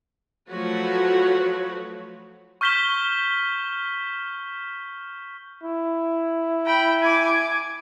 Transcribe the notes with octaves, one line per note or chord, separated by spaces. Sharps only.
F3 F#3 A3 F#4 B4 C#5
C#6 F6 G6 B6 E7 G7
E4
G5 B5
G#5 D6